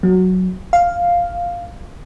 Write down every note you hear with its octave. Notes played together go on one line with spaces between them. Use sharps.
F#3
F5